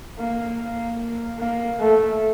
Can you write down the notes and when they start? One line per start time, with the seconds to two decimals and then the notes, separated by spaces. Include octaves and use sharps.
0.19 A#3
0.59 A#3
1.39 A#3
1.79 A3